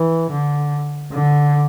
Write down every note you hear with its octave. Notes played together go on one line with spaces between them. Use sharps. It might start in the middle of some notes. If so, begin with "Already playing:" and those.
Already playing: E3
D3
D3